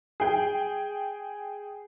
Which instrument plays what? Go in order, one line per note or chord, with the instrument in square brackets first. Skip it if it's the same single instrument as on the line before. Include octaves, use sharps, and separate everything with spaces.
[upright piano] G#4 G5